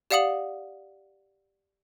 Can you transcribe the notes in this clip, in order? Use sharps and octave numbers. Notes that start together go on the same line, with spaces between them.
G4 D5 F5 F#5 D#6 F#7